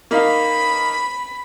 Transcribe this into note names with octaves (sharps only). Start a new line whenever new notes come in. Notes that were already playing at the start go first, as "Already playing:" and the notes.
A#3 D#4 F5 B5